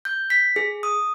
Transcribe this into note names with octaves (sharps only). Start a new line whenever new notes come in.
G6
B6
G#4
D#6